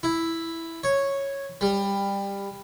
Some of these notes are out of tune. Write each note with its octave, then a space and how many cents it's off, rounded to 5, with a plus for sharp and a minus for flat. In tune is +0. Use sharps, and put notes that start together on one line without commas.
E4 +0
C#5 -5
G3 +20